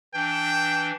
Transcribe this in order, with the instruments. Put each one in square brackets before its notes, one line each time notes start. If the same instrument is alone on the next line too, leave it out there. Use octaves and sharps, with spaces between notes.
[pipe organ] E3 D4 [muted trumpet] G5